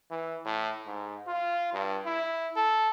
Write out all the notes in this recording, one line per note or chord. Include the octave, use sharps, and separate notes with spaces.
E3
A2
G#2
F4
G2
E4
A4